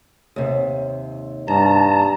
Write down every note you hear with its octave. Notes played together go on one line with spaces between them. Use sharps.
D#2 C3
G2 A5 A#5